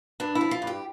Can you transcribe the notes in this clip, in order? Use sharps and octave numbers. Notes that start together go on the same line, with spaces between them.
G2 D4
E4
F3
F4
G2
G4